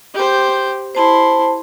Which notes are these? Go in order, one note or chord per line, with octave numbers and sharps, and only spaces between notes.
G4 C5
E4 C5 A5 C6